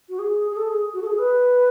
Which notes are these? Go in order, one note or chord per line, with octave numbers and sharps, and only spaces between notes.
F#4
G#4
G#4
A4
G#4
F#4
A4
G#4
B4